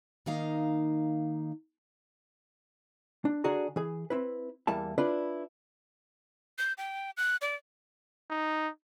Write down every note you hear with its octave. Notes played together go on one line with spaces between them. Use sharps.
D#3 A#3 D#4 F5 A#5
D4
D3 D4 F#4 G#4 A#5
E3 G#4
C4 E4 B4
E2 E3 G3 A#3 E5 A5
D4 E4 F4 B4 D5
G6
G5
F#6
D5
D#4